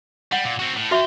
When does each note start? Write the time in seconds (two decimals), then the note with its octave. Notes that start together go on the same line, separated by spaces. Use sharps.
0.32 G3 F#5
0.45 A#2
0.59 C4 F#4
0.76 A2
0.91 F4 F#4 E5 G5 C#6